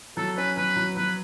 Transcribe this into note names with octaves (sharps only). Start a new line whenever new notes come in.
F#3 A4
C#4 B4
F#3 B4
F#3
F#3 B4